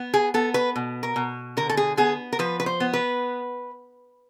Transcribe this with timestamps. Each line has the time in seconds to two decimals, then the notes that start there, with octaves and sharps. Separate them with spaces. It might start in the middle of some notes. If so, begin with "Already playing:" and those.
Already playing: B3
0.14 G#4
0.34 B3 A4
0.54 B4
0.76 B2
1.03 A#4
1.16 B2
1.57 D3 A#4
1.69 A4
1.77 G#4
1.97 B3 G#4
2.33 A#4
2.39 F3 B4
2.60 B4
2.66 C5
2.80 B3
2.94 B4